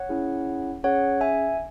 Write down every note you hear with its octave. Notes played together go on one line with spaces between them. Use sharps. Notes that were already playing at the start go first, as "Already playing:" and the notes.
Already playing: C#5 F#5
C#4 E4 G#4
C#4 G#4 C#5 F#5
E5 G#5